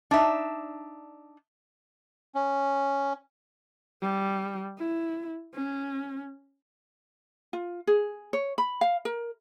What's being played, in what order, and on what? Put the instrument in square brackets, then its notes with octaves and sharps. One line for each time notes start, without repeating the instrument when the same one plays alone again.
[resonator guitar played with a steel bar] D4 D#4 E5
[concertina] C#4
[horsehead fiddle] G3
E4
C#4
[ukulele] F4
G#4
C#5
B5
F5
A#4